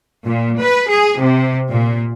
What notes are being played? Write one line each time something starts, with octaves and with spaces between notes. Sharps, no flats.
A#2
B4
G#4
C3
A#2